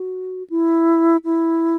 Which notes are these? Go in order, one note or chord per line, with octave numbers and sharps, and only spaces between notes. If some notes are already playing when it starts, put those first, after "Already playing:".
Already playing: F#4
E4
E4